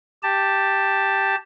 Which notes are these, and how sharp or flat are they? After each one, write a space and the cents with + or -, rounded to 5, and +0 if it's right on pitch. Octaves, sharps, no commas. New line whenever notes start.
G4 +0 A5 +5